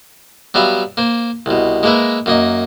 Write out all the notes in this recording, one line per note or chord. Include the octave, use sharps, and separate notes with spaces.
F#3 G3 B3 E5 F5
A#3 C5
C2 B2
G#3 A#3 A#4 B4 E5
F#2 A#3 D#5